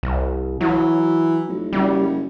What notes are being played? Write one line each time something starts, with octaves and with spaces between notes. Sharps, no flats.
C2
E3 F#3
F1
F#1 G3